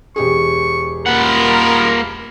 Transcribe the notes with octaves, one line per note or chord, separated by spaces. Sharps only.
E1 G4 G#4 C#6
G#3 A#3 F4 A#4 F#5 B5